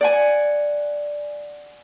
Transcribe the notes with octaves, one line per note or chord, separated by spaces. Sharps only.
D5 F#5 G#5